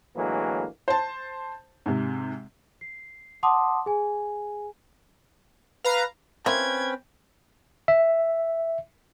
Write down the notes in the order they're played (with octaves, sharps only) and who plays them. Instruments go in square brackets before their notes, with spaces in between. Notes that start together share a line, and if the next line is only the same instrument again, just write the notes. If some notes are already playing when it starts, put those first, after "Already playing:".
[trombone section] A2 D3 E3 F#3 G#3 A#3
[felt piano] C5 A5
G#2 C3
[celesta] C7
F#5 A5 C6 D6 D#6
G#4 G#5
[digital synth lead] B4 [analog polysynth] F5 A#5
[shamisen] A#3 E4 F4 [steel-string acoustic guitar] C4 [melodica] C#4 B4 G5 [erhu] G#6
[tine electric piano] E5